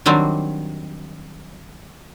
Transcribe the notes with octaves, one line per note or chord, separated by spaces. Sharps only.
D#3 F#3 G3 C4 D4